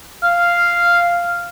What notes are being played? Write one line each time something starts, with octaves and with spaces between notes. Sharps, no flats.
F5